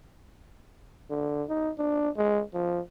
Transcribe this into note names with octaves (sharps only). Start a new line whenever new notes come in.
D3
D#4
D4
G#3
F3